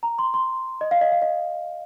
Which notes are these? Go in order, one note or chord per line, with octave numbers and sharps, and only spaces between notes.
A#5
C6
C6
D#5
F5
D#5
F5
D#5